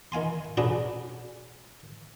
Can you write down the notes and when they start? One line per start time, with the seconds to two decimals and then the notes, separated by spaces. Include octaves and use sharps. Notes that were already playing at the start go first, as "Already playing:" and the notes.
0.12 D#3 F5 G#5 C6
0.57 C#4 D4 F#4 G#4 A#4 B4